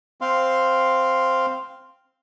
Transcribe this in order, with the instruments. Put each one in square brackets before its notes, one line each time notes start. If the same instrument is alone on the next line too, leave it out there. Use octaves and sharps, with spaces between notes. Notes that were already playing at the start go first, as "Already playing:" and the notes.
[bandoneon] C4 F5 C6